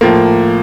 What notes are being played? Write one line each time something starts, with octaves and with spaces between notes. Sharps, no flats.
A2 F3 A#3